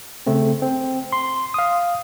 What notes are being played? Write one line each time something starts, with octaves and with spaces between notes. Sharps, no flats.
C#3 A3 C4
C4
C6
F5 D#6